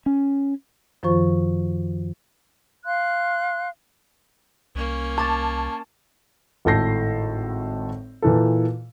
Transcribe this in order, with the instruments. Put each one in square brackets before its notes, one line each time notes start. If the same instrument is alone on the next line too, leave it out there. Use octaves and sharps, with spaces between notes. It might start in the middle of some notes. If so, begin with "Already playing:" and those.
[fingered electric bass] C#4
[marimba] F#2 D#3 F3 F4 C5 C#6
[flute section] F5 C6 F#6
[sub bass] C2 [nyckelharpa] A#3 C#4
[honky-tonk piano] A5 [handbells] C#6 D6 A6
[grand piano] G#1 A2 A4 G6 A#6 C7
A#2 E3 A4